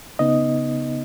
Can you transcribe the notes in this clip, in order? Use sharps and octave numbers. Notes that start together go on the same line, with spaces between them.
C#3 B3 D#4 D#5